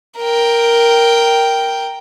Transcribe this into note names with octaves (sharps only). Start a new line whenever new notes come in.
A#4 G5